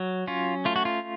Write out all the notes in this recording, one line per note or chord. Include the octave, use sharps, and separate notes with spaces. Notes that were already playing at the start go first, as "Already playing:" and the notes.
Already playing: F#3
C#4 F4
A3 F4
F#4
F4